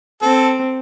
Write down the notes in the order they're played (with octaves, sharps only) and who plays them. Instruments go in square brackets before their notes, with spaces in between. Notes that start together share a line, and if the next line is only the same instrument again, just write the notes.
[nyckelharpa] C4 [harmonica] A4